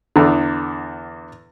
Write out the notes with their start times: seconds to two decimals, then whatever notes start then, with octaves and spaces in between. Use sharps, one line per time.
0.16 E2 D3